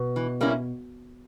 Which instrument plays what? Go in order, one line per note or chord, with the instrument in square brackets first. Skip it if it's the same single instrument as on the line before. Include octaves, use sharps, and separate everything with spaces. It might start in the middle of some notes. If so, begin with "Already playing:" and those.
Already playing: [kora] B2
[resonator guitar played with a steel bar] E3
G3 A#3 C#4 E4